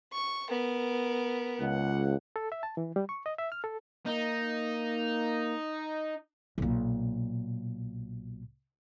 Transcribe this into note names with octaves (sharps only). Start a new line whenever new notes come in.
C#6
B3 A#4
C#2 F#5
A4
E5
A5
E3
G3
C#6
D#5
E5
F6
A4
A#3 D#4
B1 A#2